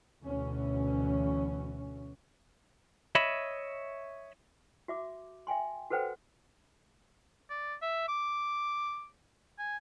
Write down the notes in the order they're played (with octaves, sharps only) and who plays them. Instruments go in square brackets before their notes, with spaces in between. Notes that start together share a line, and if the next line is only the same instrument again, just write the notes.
[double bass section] D2 B2 E3 C#4
[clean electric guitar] C#5 D#5 E5 B5
[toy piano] F#4 E5 D6
E5 G5 G#5 C6
F#4 A4 B4 C5 F#5 G5
[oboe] D5
E5
D6
G#5